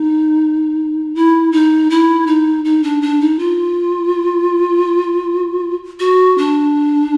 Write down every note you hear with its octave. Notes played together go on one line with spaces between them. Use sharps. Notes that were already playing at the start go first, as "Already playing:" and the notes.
Already playing: D#4
E4
D#4
E4
D#4
D#4
D4
D4
D#4
F4
F#4
D4